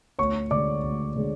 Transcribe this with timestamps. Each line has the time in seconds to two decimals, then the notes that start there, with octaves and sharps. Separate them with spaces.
0.19 D2 C#5 C#6
0.51 D3 G#3 D5 D6
0.83 D2
1.16 D3 G#3